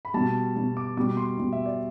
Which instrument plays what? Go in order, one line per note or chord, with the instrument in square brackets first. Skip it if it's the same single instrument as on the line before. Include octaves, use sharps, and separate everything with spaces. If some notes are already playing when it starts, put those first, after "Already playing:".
[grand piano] B5
B2 G3 A5
B2 G3
D6
B2 G3 D6
C6
B2 G3
E5
D5